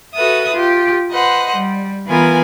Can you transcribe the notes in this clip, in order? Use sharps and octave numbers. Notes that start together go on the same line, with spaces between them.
F#4 A4 B4 E5 D#6
F4 G4
B4 C5 D#5 F#5
G3
E3 B3 F4 A#4 B4 G#5